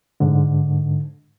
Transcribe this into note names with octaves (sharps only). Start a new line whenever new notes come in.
G#2 D3